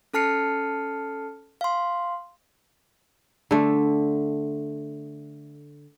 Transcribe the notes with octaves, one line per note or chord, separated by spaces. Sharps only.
C#4 A4 A5 F6 C7 C#7
F5 C6
D3 A3